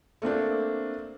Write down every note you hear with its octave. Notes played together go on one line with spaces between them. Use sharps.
A3 A#3 C4 D4